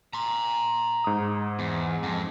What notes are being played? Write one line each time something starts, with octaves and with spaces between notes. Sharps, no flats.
A#5 C6
G#2 D#6
E2
F2